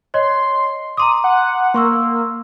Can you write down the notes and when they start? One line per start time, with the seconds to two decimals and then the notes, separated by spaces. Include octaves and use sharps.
0.14 C#5 D#5 C6
0.97 A#5 C6 D6 D#6
1.24 F#5
1.74 A#3 C6 C#6 E6